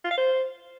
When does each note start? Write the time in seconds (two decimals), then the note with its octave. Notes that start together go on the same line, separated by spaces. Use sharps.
0.05 F4
0.11 F5
0.18 C5